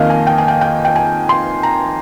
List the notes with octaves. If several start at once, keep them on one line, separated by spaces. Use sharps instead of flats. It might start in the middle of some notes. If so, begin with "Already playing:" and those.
Already playing: F2 D#3 A#3 D#5 F5 G#5
G#5
G5
G#5
G5
G5
G5
G#5
C6
A#5